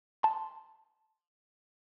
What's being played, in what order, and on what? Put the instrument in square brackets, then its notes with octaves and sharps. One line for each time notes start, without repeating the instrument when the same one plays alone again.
[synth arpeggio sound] A5 C6